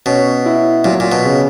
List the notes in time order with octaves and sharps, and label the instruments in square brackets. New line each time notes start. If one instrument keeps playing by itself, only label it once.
[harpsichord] B2 [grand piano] C#4
[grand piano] E4
[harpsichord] A#2 [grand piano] F#3
[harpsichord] A#2
B2
[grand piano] C#3